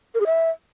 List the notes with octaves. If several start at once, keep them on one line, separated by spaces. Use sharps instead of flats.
A#4
G#4
E5